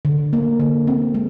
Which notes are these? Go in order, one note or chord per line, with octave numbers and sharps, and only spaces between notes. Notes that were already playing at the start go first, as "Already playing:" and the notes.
D3
A#3
D3
C4
G#3